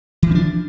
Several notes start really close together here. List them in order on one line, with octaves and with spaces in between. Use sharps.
E3 F3 C#4 D4